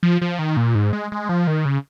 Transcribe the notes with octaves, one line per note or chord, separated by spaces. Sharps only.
F3
F3
D#3
A#2
G#2
G#3
G#3
F3
D#3
C#3